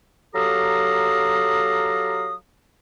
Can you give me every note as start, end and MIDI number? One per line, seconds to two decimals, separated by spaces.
0.35 2.34 54
0.35 2.34 67
0.35 2.34 69
0.35 2.34 77
0.35 2.34 82
0.35 2.34 87